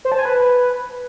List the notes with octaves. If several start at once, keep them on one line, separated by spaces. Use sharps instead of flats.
C5
A5
G#5
B4